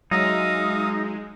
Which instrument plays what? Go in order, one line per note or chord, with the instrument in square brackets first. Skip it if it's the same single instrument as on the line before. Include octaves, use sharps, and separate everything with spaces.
[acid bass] F#3 [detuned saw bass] G#3 [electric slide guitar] D#4 [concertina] E5 F5 D#6